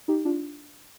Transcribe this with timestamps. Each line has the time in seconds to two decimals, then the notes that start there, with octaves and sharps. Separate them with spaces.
0.08 D#4 G4
0.25 D4 F4